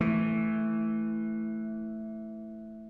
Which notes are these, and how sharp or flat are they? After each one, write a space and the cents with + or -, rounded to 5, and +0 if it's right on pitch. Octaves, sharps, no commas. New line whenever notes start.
E3 +0 A3 +0